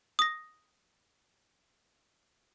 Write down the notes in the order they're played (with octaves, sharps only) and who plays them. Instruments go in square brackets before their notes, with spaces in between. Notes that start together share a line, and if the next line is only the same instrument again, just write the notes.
[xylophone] D#6 A#6